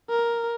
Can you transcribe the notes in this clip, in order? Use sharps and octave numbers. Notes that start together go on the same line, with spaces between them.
A#4